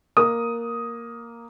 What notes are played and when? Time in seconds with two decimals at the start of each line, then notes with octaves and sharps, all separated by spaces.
0.17 A#3 D#6